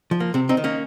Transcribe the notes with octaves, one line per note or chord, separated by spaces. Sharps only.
F3
A#3
C3 C4
C4 D#4
D#3
A#3 C#4